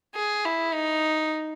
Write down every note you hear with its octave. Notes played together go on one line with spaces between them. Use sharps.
G#4
E4
D#4